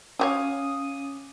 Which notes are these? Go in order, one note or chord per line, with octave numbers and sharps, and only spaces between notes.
F#3 C#4 F#4 C#5 F5 G#5 D6 D#6